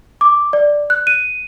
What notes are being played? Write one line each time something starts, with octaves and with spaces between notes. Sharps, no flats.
D6
D5
F#6
D#7